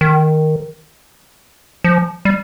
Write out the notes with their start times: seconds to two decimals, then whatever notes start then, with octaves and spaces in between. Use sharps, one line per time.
0.01 D#3
1.84 F3
2.25 G3